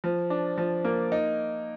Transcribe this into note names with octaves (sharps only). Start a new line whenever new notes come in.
F3
D4
F3
A#3
D#4